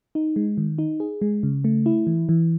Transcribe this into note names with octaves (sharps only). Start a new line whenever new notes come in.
D#4
G#3
D#3
D#4
G#4
G#3
C#3
A3
E4
E3
E3